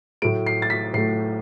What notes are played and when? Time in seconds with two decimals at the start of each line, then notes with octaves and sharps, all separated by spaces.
0.22 A2 F#3 A3 D7
0.47 C7
0.62 A6
0.70 B6
0.94 A2 F#3 A3 C7